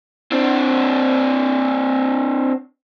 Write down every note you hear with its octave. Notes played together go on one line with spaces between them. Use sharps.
C4 D4